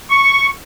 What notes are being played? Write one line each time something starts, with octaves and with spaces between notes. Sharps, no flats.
C#6